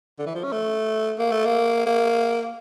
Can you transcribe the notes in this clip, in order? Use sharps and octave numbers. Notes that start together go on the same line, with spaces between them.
D3
E3
F3
C#4
A3
A#3
A3
A#3
A#3